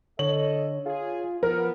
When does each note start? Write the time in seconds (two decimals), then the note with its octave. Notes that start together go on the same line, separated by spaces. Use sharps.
0.19 D3 A4 C#5 D#5 F#7
0.86 F4 G#4
1.43 F3 B3 A#4